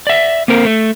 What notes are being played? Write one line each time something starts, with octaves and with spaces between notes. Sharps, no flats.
D5 E5
A#3 C4 A#4
A3